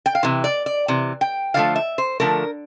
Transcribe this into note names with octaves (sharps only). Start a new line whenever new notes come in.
G5
F5
C3 E3
D5
D5
C3 E3
G5
D3 F3 A3 F5
E5
C5
D3 F3 A3 A#4